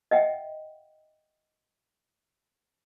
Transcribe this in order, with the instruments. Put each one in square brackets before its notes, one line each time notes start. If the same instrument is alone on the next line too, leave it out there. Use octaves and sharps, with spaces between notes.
[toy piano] D#5 E5 F#5 G5